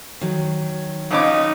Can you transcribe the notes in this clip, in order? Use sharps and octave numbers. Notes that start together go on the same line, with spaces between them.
D#3 F#3
A#1 C#4 D#4 D6